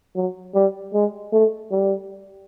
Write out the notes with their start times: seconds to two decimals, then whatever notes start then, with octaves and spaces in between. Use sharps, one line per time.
0.16 F#3
0.54 G3
0.93 G#3
1.32 A3
1.71 G3